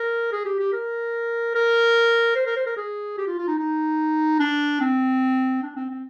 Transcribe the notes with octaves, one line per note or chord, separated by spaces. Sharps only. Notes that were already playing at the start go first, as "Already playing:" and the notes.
Already playing: A#4
G#4
G4
G4
A#4
A#4
C5
A#4
C5
A#4
G#4
G4
F4
F4
D#4
D#4
D4
C4
D4
C4
C4